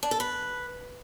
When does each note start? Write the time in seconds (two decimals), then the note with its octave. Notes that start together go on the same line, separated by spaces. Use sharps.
0.03 D4
0.11 A4
0.20 B4